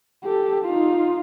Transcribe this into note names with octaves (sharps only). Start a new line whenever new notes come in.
G4 A4
D#4 F4